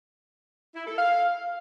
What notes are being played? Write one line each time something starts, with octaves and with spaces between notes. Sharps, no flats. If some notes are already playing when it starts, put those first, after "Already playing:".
E4
A4
F5